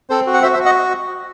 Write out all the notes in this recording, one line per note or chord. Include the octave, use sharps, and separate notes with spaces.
C4 A4 C5
F#4
F#5
F#4 C5 E5
C5 E5
F#4
D#5 F#5